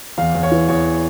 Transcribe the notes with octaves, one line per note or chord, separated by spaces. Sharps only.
E2 F5
E2
C#5
E3
E2 C#5